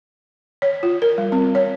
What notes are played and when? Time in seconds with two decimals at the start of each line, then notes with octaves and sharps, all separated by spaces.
0.62 C#5
0.83 F4
1.02 A#4
1.18 G3
1.32 C4
1.55 C#5